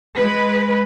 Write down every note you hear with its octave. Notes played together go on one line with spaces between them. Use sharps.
G#3 B4